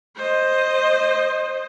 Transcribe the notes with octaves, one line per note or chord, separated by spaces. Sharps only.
C5 D#5